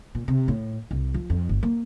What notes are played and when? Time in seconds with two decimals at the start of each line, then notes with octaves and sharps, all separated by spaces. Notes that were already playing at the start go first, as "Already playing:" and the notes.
0.15 A#2
0.28 C3
0.48 A2
0.91 C2
1.14 F3
1.30 F2
1.49 G1
1.63 A#3